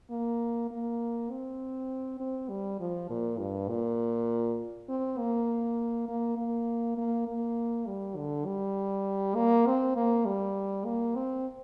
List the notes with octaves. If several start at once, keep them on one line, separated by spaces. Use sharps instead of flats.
A#3
A#3
C4
C4
G3
F3
A#2
G2
A#2
C4
A#3
A#3
A#3
A#3
A#3
G3
D3
G3
A#3
C4
A#3
G3
A#3
C4